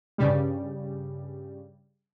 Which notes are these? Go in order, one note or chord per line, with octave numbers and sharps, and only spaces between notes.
G2 C#3 G3